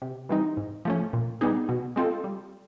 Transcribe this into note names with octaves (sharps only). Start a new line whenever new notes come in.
C3
E3 G3 C4 D#4
G#2
F3 A3 C#4
A#2
G3 B3 D#4 G#4
B2
G#3 C4 F4 A4
G3